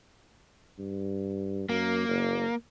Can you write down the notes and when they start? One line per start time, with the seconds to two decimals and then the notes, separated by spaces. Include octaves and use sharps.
0.79 G2
1.69 F#2 A#3
2.09 F#1